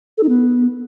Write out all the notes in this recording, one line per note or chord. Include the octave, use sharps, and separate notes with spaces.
A4
D#4
B3